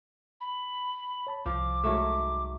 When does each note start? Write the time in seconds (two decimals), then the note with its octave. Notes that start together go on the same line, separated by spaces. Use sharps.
0.41 B5
1.27 C#5 A5 B5
1.46 C2 F3 D6
1.84 G#2 F#3 A3